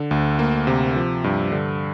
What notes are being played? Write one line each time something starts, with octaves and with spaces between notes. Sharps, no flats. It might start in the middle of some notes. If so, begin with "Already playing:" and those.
Already playing: D3
D2
A#3
C3
F3
G2
D3